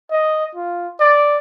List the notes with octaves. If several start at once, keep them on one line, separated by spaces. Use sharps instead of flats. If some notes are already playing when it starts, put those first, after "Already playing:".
D#5
F4
D5